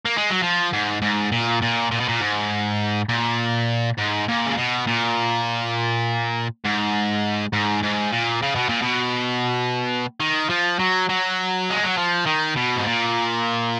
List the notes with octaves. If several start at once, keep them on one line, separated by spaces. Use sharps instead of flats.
A#3
G#3
F#3
F3
G#2
G#2
A#2
A#2
A#2
B2
A#2
G#2
A#2
G#2
A#2
C#3
B2
A#2
G#2
G#2
G#2
A#2
C#3
B2
A#2
B2
D#3
F3
F#3
F#3
G#3
F#3
F3
D#3
B2
G#2
A#2